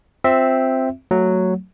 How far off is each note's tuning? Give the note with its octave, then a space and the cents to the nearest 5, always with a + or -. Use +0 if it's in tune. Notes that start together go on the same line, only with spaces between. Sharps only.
C4 +0 F4 +25 E5 +0
F#3 +0 A3 +20